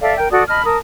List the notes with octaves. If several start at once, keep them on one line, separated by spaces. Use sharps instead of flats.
A4 D5 E5 F5
A#4 G5
F#4 A4 D5 D#6
D#5 A5 B5 F6
A#4 A5 D#6